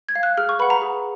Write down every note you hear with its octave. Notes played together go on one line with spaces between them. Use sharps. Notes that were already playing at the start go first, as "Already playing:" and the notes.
G#6
F5
F#6
G#4 F6
C#6
B4 F#5 B5
A#5
G#4